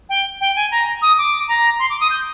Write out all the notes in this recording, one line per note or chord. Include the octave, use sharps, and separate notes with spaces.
G5
G5
G#5
A#5
D#6
D6
A#5
C6
D6
D#6
G6